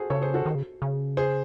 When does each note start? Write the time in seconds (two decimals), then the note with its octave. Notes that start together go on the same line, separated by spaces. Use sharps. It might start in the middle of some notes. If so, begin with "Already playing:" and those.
Already playing: F#4 G#4 A4 C5
0.10 C#3 A4 C#5
0.22 G#4 C5
0.34 F#4 A4
0.46 D#3
0.55 C#3
0.82 C#3
1.17 G#4 C5